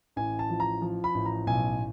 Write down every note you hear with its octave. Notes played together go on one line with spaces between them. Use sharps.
A1 G#5
A5
F3
A#5
F3
B5
A1
A#5
B1 G#5